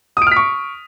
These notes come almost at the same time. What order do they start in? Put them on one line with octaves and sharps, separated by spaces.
D#6 D7 F6 B6 C#6